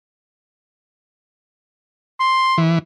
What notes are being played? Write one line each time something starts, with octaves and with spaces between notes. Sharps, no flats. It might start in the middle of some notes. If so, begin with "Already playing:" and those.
C6
E3